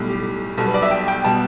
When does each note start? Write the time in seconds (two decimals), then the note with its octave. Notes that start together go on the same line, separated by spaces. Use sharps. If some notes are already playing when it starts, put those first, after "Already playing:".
Already playing: B1 A2 G3
0.08 G4
0.57 B1 B2 G3 A4
0.66 B4
0.74 D5
0.82 E5
0.91 G5
1.08 G5
1.24 B2 G3 A5